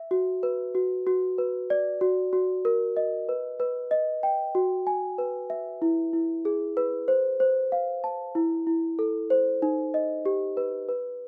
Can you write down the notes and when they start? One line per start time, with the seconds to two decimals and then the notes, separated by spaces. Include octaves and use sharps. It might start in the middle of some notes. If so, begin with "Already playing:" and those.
Already playing: E5
0.11 F#4
0.43 B4
0.75 F#4
1.07 F#4
1.38 B4
1.70 D5
2.01 F#4
2.33 F#4
2.65 A#4
2.97 D#5
3.29 B4
3.60 B4
3.91 D#5
4.23 G5
4.55 F#4
4.87 G#5
5.18 B4
5.50 E5
5.82 E4
6.13 E4
6.45 G#4
6.77 B4
7.08 C5
7.40 C5
7.72 F5
8.04 A5
8.35 E4
8.67 E4
8.99 A4
9.30 C5
9.62 D#4
9.94 D#5
10.26 G4
10.57 B4
10.89 B4